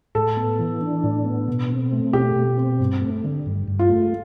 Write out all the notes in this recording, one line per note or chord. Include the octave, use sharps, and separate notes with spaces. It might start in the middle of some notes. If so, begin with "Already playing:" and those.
A2 A4
B3
E3
D4
A2
B3
B2
C4
A3
B2 G4
B2
C4
G2
A3
D3
G2
G2
F4
A3